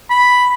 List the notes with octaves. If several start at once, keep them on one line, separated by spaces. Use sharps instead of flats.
B5